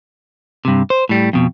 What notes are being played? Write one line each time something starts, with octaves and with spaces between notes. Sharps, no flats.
G2 C3
C5
A2 G3
F2 B2